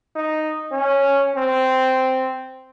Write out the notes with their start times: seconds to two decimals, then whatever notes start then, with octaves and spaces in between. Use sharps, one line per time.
0.16 D#4
0.72 C#4
1.36 C4